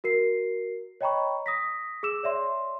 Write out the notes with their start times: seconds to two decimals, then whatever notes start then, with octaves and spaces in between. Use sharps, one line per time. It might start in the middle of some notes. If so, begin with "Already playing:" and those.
0.04 F#4 A#4 C7
1.01 C#5 D#5 G5 A#5 B5 C#6
1.46 D#6 A#6 B6
2.03 G#4 D6 E6 E7
2.23 C#5 D5 E5 C6